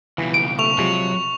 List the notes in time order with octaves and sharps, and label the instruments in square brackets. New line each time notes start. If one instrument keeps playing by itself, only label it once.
[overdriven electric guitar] C#2 B2 [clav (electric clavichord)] E3
[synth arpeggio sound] D7
[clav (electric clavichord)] A3 [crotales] C#6 F7
[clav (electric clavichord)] C3 F3 G#3 [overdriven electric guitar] F#3